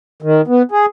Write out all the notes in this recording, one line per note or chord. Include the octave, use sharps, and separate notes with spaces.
D#3
B3
G#4